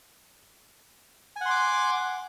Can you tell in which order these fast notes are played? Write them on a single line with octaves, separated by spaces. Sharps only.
G#5 F#5 C6 D6